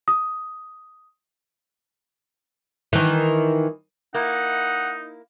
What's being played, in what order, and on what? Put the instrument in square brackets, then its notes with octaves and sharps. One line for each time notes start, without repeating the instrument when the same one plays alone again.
[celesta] D#6
[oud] D#3 E3
[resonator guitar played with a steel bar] A#3 E4 [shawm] D#4 [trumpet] F#5